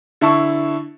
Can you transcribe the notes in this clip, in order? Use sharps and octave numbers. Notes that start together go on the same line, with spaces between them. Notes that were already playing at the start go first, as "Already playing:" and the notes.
D3 E4 A5 C#6